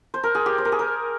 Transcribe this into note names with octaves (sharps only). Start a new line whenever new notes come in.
C5
A#4
G#4
G4
C5
A#4
G#4
A#4